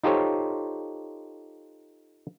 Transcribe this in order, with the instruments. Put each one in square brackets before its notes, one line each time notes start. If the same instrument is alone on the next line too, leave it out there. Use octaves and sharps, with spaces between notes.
[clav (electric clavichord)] D#4 F4 G4 A4 C5 C#5